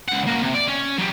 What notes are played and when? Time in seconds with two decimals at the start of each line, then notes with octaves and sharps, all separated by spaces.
0.08 C#2 F#5
0.27 A#3 F#4
0.42 C3
0.54 D5
0.68 C#4
0.99 F#3 G4